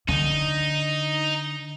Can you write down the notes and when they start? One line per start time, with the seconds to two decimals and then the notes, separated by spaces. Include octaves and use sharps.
0.09 D3 D#4